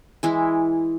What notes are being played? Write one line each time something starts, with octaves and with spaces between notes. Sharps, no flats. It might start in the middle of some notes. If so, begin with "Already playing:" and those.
E3 G#3 E4